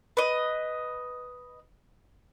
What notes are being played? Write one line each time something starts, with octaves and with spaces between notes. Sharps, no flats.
B4 D#5